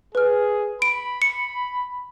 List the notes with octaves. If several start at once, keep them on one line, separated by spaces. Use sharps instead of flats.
G#4 B4 F6
B5 D7
C#7